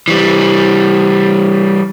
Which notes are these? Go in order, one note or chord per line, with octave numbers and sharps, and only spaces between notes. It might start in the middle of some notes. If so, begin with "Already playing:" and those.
E3 G3